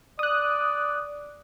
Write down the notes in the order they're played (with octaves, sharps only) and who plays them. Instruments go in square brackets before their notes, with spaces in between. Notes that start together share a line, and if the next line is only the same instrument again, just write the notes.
[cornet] D5 [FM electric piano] D#6 F#6